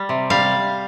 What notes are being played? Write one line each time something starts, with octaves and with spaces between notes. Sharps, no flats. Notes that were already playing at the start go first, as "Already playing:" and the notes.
Already playing: G3
C3
G3 F5